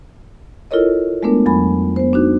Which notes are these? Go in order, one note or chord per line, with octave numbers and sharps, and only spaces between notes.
E4 F4 A4 A#4 C#5 D#5
G#3 A3 B3 D4 A#4
F2 F#3 G#5 B5
B3 C5
D4 D#4 F#4